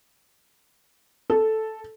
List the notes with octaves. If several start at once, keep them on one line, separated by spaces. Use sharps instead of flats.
A4